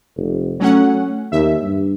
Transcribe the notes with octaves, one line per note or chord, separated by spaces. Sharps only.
F1
F#3 A3 C#4 F#5
D#2 E5
G2